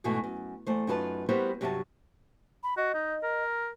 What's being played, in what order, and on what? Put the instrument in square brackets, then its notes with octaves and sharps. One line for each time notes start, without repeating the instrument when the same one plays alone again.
[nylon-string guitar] G#2 B2 E3 A3 F#4
F#2
E2 A3 C5
F#2 D#4 F4 B4 A5
G3 B3 E4 F#4 A#4 C5
G2 C3 F#3 F#4 E5 A5
[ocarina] B5
[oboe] F#4 [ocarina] D#5
[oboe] D#4
A#4